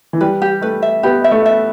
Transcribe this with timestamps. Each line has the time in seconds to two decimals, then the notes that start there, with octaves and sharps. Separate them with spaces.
0.13 E3
0.21 G3 B4
0.42 G4
0.62 A3 B4
0.83 E5
1.03 B3 G4
1.24 E5
1.31 A3
1.46 E5